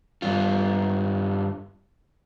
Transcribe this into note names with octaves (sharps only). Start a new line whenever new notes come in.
G2 F4